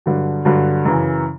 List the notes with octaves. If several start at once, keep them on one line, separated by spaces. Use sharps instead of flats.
G2 D3 F#3
G2 D3 F#3
F#2 C#3 E3